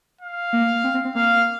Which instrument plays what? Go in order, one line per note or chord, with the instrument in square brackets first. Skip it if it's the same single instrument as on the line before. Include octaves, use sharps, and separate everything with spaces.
[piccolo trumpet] F5
[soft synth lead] A#3
C4
C4
C4
[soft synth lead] A#3 [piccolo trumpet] F5